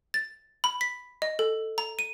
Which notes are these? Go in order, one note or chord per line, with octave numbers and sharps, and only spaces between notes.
A6
B5
B6
D#5
A4
A#5
D#7